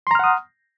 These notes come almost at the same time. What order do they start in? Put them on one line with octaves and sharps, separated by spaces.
C6 A#5 F6 F#5 D#6